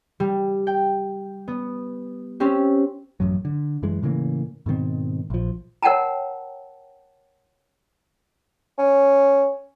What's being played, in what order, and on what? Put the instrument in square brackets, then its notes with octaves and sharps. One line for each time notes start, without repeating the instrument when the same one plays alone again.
[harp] G3
G5
B3
C4 C#4 G4
[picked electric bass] A1 F#2 F#3
D3
F#2 E3 G#3
A2 C#3 E3 A#3
G#2 B2 D#3 C4
A#1 F3
[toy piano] A#4 C#5 F#5 G5 A5 A#5
[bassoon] C#4